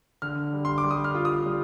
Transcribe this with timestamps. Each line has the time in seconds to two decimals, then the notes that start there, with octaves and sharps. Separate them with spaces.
0.22 D3 F6
0.53 G3
0.65 C6
0.78 D6
0.84 G3
0.91 D#6
1.04 F6
1.15 F4
1.25 D#6
1.46 G3